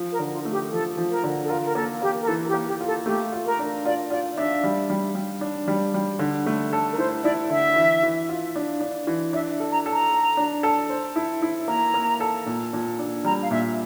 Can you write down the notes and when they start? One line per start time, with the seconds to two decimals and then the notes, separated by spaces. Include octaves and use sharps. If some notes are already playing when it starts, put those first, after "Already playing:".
Already playing: F3
0.12 A#4
0.19 D3
0.33 F4
0.45 A3
0.52 G4
0.71 F3 A4
0.97 F3
1.10 A#4
1.24 D3
1.44 A4
1.49 F4 A#4
1.65 A#4
1.75 A#3 A4
2.02 A#3 G4
2.22 A#4
2.27 E3 A4
2.48 G4
2.54 A#3
2.67 G4
2.81 F4
2.86 A4
3.06 A3 G4
3.33 F4
3.46 A#4
3.59 D4
3.85 F4 D5
4.10 F4 D5
4.36 D4 E5
4.64 G3
4.90 G3
5.15 G3
5.41 D4
5.68 G3
5.94 G3
6.19 D3
6.46 A3
6.73 A4
6.92 A#4
6.98 E4 C5
7.24 E4 D5
7.50 D3 E5
7.76 E3
8.03 E3
8.29 F4
8.56 D4
8.80 D4
9.07 E3
9.33 D4 E5
9.60 A4
9.72 A#5
9.86 A4
9.92 A#5
10.11 A4
10.37 D4
10.63 A4
10.90 C5
11.16 E4
11.42 E4
11.68 A#3 A#5
11.94 A#3
12.20 A4
12.46 A#2
12.73 A#2
12.99 D4
13.24 G3 A#5
13.42 F5
13.51 A#2 E5